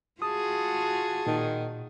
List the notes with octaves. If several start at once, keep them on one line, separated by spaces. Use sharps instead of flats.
F4 F#4 G#4 A5 D#6
A#2 D#3